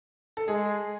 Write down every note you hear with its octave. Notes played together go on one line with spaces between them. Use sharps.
A4
G#3 G#4